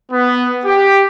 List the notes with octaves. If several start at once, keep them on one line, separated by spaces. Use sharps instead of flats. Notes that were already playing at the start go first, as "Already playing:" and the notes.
B3
G4